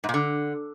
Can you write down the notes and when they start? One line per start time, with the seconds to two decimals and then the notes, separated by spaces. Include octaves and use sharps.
0.04 G#2
0.09 A#2
0.14 D3